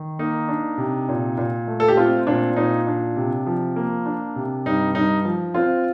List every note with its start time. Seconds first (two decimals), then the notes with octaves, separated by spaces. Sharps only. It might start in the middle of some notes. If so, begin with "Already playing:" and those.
Already playing: D#3
0.19 A#3 D#4
0.48 D4
0.78 C3
1.09 A#2
1.38 A#2
1.68 A3
1.80 A4
1.88 G4
1.97 C4 F4
2.27 A#2 D4
2.56 A#2 D#4
2.87 D4
3.16 C3
3.47 F3
3.76 A#3
4.06 D4
4.36 C3
4.66 G2 D#4
4.95 G2 D#4
5.25 F3
5.54 C4 F4